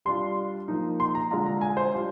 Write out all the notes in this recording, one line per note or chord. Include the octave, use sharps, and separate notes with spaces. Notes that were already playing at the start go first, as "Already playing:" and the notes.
G3 D4 F4 C6
F3 A#3 D#4
C6
A#5
D3 G#3 D4 F4 A#5
A#5
G#5
C5
G3 D4 F4